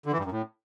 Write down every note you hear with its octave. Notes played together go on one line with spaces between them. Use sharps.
D3
E3
G2
F#2
A2